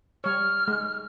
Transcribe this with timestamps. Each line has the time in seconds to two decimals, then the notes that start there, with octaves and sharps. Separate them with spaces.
0.24 G3 C#5 F6
0.68 G#3